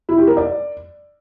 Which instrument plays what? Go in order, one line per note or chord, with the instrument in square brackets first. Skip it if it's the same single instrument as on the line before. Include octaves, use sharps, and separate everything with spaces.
[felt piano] E4
G4
A#4
D5